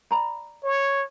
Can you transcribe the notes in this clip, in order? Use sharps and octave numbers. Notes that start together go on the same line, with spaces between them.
D5 A#5 B5
C#5